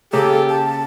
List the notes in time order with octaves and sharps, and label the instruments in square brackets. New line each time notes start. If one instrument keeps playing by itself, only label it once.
[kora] C#3 A#3 [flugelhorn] G4 [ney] A4
[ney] A5